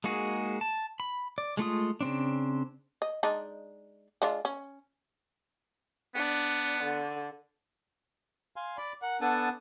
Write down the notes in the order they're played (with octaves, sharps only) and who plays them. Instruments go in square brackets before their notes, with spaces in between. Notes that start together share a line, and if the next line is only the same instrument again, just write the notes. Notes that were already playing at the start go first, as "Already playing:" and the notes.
[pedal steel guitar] G#3 A#3 D#4 F#4 G#4
A5
B5
D5
G#3 A3 F4 D#6
C#3 C4 D4
[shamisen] D#5
G#3 D4 D#4
G#3 D4 F4
C#4
[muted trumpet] B3 [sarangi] D4
[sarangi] D3
[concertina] F5 G#5 C6
[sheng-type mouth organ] D5 [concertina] B5
[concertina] A#4 [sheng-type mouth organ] F#5
[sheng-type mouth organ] B3 D4 G#5 [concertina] A4 F#5 A5